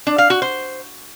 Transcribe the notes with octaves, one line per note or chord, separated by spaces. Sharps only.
D4
F5
F#4
C5